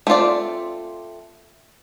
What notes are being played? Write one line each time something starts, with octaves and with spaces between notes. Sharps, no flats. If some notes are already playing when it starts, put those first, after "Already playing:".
A3 C4 F4 D5